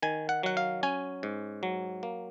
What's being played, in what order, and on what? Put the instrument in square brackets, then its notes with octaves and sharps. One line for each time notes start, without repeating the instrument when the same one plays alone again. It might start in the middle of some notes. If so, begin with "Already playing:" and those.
[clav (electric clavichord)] D#3 G#5
F#5
F#3 F#5
F5
C#4 G#5
G#2
F#3
A#3